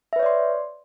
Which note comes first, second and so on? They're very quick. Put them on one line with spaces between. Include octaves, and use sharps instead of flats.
E5 B4 C#5 D5 C6